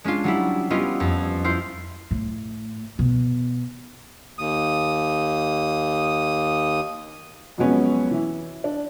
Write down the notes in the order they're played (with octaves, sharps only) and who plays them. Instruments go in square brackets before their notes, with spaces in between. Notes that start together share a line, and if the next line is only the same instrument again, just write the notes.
[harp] G#3 C#4 D4 F4
F#3 G3 E4
G3 B3 C#4 E4 F4 D#5
F2
E4 F4 C5
[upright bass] A2
B2
[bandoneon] D#2 D#6
[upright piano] F2 F#3 G#3 B3 C#4
E3 E4
D4